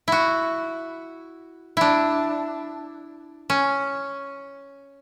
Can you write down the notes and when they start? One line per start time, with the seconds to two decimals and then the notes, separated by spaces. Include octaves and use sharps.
0.08 E4 F#4
1.77 D4 E4
3.50 C#4